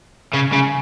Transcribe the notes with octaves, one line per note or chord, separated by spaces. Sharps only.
C#3
C#3